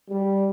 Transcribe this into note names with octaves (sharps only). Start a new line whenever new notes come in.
G3